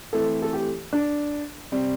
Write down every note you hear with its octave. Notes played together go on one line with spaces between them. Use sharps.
E3 A3 C4 A4
A4
G4
D4
C3 G3 C4